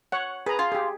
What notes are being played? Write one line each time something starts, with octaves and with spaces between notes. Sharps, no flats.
C#5 F#5
G#4 B4 A#5
F4
G4 G#4